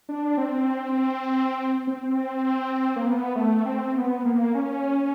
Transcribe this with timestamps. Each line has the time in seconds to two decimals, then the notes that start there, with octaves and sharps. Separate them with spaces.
0.09 D4
0.38 C4
1.87 C4
2.96 A#3
3.06 B3
3.36 A3
3.66 C4
3.96 B3
4.25 A#3
4.55 C#4